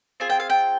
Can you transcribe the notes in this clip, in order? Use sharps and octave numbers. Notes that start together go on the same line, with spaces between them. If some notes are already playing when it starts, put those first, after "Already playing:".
C4 F4 G#4 G#5
G5
F5
G5